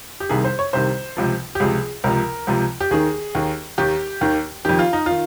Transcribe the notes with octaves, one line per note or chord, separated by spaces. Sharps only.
G4
C2 C3 D#3 G#4
C5
C#5
C2 C3 D#3 C5
C#2 C3 F3
G4
C#2 C3 F3 G#4
C#2 C3 F3 A#4
C#2 C3 F3
G4
D#2 D#3 G#4
D#2 D#3
D#2 D#3 G4
D#2 D#3
F2 D#3 G4
F4
D#4
D#3 F4